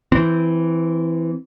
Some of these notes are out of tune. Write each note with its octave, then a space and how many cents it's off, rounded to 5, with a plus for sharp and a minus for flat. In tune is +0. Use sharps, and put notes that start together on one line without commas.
E3 +0 C4 -15